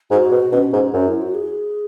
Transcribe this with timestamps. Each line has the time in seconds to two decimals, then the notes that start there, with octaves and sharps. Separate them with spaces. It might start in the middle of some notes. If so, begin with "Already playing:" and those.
0.11 G#2 F#4
0.32 B2
0.52 B2 C#4
0.73 G#2
0.93 F#2 C#4
1.08 E4
1.22 F#4
1.35 G#4